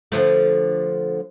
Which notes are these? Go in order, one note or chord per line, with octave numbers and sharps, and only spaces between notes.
D3 F3 A3